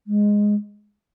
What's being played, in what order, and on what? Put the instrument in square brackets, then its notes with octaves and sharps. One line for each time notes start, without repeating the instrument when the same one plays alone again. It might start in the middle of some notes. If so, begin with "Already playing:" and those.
[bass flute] G#3